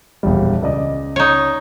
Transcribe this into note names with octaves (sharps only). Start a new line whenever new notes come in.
E1 A#1 G3
C#2 D5 D#5
D#4 C#5